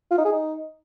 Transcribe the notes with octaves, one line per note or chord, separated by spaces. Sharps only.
F4
D#4
G#4
D#4